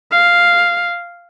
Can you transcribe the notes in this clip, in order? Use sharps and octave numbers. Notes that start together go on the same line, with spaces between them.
F5